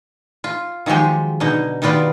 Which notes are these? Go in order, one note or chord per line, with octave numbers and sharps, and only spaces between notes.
F4
D#3 F3 F#3 G#3 G4
B2 D3 D#4
D#3 G3 B3 F4 D5